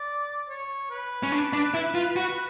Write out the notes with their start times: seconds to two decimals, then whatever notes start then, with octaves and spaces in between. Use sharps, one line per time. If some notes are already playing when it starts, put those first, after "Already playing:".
Already playing: D5
0.49 C#5
0.90 B4
1.23 C#4
1.32 D4
1.53 D4
1.74 E4
1.95 F4
2.16 F#4